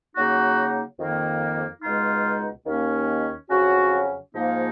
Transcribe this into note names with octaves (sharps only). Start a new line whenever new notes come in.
C#3 F#3 A#3 D#4 F#4
F2 D#3 A#3
C#2 B2 G#3 D#4 F4
D#2 D#3 A#3 C#4
F2 C#3 F#3 C#4 F#4
G#2 F3 A#3 D#4